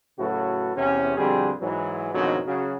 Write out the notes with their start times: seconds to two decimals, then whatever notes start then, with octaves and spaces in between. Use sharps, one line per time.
0.19 A2 C#3 F#3 F#4 A4 B4
0.75 E2 C3 C#4
1.17 F2 B2 D3 G3 C4 G#4
1.61 G#2 E3 F#3
2.14 F2 G#2 B2 D3 D#3 F#3
2.46 C#3 F#3 F#4